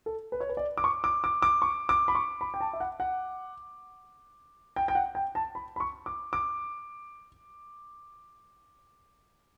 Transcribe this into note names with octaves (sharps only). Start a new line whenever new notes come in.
A4
B4
C#5
B4
D5
D6
C#6
D6
D6
D6
C#6
D6
B5
C#6
B5
G5
A5
E5
F#5
F#5
G5
G5
F#5
G5
A5
B5
B5
C#6
D6
D6